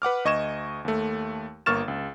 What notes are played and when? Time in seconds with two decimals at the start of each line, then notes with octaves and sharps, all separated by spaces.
0.02 B4 F#5 D6 F6
0.25 D2 D#5 C#6 G#6 E7
0.85 D#2 A3
1.66 G1 A#3 C#6 F6 A6 E7
1.88 C#2